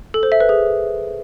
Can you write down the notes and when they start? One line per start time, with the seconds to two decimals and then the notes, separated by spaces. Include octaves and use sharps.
0.14 A4
0.23 C5
0.32 E5
0.40 B4
0.49 G#4